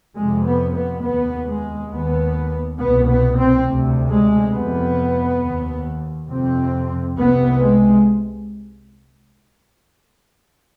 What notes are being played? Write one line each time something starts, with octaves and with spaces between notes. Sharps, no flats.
F2 C3 G#3
B3
B3
D#2 B3
G#3
D#2 B3
C2 B2 B3
B3
C4
D2 C3
G#3
F2 C3 B3
D#2
F2 C3 C4
C2 C3 B3
G#3